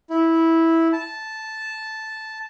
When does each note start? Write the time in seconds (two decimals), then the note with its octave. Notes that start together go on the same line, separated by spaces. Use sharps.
0.10 E4
0.93 A5